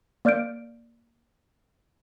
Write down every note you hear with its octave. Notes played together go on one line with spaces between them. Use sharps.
A#3 D5 F6 G6 D7